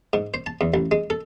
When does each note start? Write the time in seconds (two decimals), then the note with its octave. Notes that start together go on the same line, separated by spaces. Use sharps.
0.13 G#2
0.34 C5
0.46 A5
0.61 E2
0.74 A1
0.91 G#3
1.10 A4